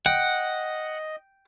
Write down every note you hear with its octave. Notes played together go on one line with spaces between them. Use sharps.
D#5 F#5 G5